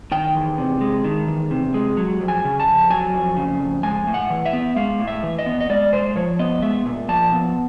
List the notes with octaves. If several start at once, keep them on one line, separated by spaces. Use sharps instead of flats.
D#3 G5
E2
C3
G#3
D#3
E2
C3
G#3
F#3
F2
G#5
C#3
A5
F2
F#3 G#5
F2
C#3
F2
G#3 G#5
A2
F#5
E3
E5
B3
G#3 F5
A2
E5
E3
D#5
B3
D#5
G#3 D5
A#2 C5
F3 C#5
B3 D#5
G#3 E5
A#2
F3 A5
B3